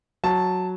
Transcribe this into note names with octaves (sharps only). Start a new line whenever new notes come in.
F#3 A5